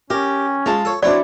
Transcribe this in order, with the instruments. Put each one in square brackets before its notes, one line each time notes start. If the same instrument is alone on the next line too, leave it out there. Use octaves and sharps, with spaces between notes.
[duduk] C#4 [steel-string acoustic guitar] G4 [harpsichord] A#4
[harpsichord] G#3 [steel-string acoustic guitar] F4 A5
[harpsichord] A4 C#5
[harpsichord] F#3 C4 [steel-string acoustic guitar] D4 E4 C#5 [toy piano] D5